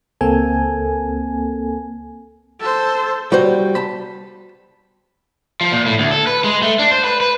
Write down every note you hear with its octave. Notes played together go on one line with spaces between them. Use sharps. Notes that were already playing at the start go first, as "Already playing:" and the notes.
C#2 A#3 C4 A4 G#5
A4 C5
G3 F#4 C5
A5 B5
F3
A#2
A2
D2
A4
B4
G#3
A3
D4
C5
B4
B4